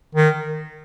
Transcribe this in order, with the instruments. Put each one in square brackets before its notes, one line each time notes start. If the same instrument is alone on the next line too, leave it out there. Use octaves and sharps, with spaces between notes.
[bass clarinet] D#3